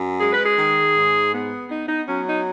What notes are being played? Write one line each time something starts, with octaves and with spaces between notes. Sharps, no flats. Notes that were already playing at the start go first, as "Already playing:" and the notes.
Already playing: F#2
G#3 G#4
B4
G#4
D#3
G#2
B3
B3 D#4
D#4
F#3 C#4
D#4